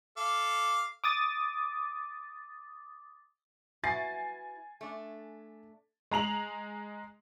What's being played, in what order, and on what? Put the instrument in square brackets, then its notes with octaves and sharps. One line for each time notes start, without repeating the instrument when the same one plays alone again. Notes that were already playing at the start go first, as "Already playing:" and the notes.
[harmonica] A4 F5 D6
[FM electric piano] D6 D#6 A6
[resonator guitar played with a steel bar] E4 F#4 B4 [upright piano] G#5 A6 C7
[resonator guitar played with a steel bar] A3 D4
[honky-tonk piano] G#3 A#5 F7 F#7